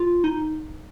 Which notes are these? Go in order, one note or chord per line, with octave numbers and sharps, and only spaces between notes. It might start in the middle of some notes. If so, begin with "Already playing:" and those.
Already playing: F4
D#4